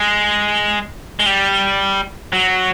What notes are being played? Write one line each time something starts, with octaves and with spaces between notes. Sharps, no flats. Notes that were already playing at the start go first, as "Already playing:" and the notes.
Already playing: G#3
G#3
G3
F#3